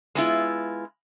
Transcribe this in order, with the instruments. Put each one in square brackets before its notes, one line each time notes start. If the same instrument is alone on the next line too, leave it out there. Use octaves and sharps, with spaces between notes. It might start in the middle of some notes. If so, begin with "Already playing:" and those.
[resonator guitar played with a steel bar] G#3 B3 E4 F4